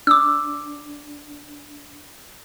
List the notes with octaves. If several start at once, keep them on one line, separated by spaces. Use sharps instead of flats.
D4 D6 E6